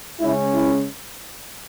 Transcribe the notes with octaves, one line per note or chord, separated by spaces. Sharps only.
C#3 G#3 C#4 E4
E4